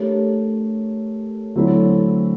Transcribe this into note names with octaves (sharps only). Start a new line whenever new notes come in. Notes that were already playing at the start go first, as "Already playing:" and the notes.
Already playing: A3 D4 G4 A#4 C#5
D3 F#3 A3 C4 E4